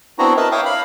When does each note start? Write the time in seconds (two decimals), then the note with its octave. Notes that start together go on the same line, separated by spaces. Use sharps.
0.19 B3 C4 D4 E4 F#4 A#5
0.37 A#4 B4 D#5 E5 A5
0.52 C#5 E5 F5 G5 D6 D#6
0.65 F5 B5